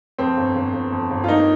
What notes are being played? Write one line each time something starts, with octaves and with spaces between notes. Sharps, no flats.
F2 C4
G1
G1
G1
F2
G1
F4
D#3 A#3 D#4